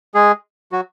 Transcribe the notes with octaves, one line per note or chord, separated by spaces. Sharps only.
G#3 G#4
F#3 F#4